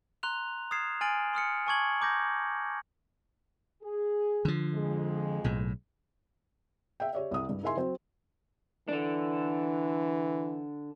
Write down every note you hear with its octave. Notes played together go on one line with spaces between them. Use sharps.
A#5 C6 F#6 F7
D#6 F6 G#6 A6 C7 E7
G#5 C6 F6 A6 D7 F#7
C6 D#6 F6 C#7
G#5 A5 C#6 D6 G#6 F#7
A#5 D6 G6 A#6
G#4
D3 F3
F2 G#3
B1 A2
E5 F5 G5
G4 C#5 D5 E5
C2 D#6
G2
D#4 E4 A#4 E5 G#5 C6
F#3 C4 C5
D3 E3 D4